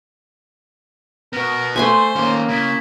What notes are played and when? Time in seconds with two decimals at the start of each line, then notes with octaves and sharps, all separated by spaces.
1.33 B3 F#4 A#4
1.76 A3 C5 G#5 B5 C6
2.16 D#3 A#3 C#4
2.49 C#3 E4